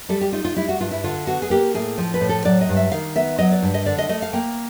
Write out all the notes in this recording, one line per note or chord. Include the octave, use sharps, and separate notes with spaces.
G3 A4
G4
D#4 F4
F4
G3 E4
F#4
G2 F4
E4
D3 F4
B3 F#4
G#4
A#3 G4
A2 G#4
F3
B4
A2
A4
F#3 D5
D#5
G2
E5
D#3 F5
B3 E5
F#3 D#5
D5
G2
D#5
D3 D5
D#5
A3 D#5
F5
A#3 G5